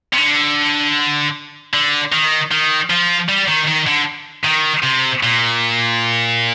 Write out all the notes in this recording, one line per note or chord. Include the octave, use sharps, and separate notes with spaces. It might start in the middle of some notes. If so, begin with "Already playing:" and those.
C3
D3
D3
D#3
D#3
F3
G3
D#3
D#3
D3
D#3
C3
A#2